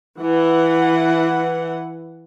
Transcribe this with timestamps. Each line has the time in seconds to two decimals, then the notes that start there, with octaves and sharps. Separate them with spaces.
0.20 E3 F#5